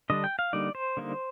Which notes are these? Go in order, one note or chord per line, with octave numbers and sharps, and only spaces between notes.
D3 G3 D4 D#5
G5
F5
D3 G3 A#3 D#4 D5
C5
D3 G3 A#3 D#4